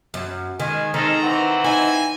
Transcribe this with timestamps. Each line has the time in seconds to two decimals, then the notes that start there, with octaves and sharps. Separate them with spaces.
0.14 F#2
0.60 D#3 G#3 G#5
0.94 D#3 G#3 C4 A4 A#5
1.22 E3 C4 F#5
1.64 D#4 G#5